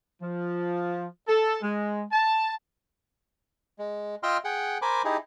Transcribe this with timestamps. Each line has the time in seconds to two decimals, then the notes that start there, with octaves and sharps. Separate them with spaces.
0.21 F3
1.28 A4
1.62 G#3
2.12 A5
3.79 G#3
4.23 F4 D#5 E5 G5 C6 F6
4.44 G#4 F#5 G5
4.82 A#4 C5 G#5 B5 D6
5.05 D#4 E4 G4 G#4